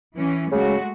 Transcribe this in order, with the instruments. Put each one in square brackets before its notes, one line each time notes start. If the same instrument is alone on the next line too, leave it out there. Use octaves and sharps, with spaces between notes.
[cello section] E3 C#4
[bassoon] C#3 [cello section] G#3 A3 F#4